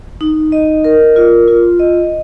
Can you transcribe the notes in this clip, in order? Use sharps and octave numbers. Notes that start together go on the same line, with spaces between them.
D#4
D#5
A#4
F4
F4
D#5